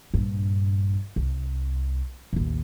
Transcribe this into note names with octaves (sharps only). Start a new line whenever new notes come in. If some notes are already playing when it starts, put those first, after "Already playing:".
A#1 G2
C2
A1 D#2